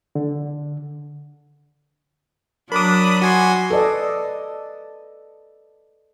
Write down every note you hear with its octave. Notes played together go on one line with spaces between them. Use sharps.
D3
F#3 D4 A#4 B5 D6 D#6
F#4 G#5 C6
A4 B4 D5 D#5